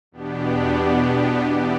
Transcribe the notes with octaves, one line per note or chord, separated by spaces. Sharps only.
E2 B2 B3 D4 G4
E3 B3 E4 G4 D5